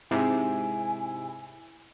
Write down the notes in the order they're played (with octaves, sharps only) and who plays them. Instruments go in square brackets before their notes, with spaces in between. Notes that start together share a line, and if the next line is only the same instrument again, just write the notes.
[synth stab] G#2 C3 [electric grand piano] E4 [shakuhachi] G#5